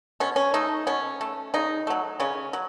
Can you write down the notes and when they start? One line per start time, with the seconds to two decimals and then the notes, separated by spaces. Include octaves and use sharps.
0.20 B2 C#4
0.36 C#4
0.54 A3 D#4
0.87 B2 C#4
1.21 A3
1.54 C#3 D#4
1.87 F#3 A3
2.20 C#3 C#4
2.53 F#3